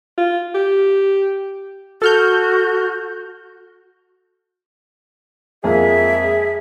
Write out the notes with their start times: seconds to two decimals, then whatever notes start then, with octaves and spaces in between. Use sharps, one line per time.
0.18 F4
0.55 G4
2.02 F#4 A4 F6 G6
5.64 F2 G#3 A#3 G#4 E5